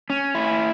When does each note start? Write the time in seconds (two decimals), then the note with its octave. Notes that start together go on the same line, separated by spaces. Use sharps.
0.10 C#4
0.35 E4